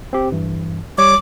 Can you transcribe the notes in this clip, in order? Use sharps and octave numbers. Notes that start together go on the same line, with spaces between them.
C4 G4
G2 E3
G3 C#5 D6